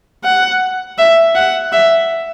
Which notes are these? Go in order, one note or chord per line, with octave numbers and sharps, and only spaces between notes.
F#5
E5
F#5
E5